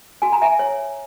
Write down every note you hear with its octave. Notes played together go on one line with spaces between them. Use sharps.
F#4 G#5
A#5
E5 G#5
C#5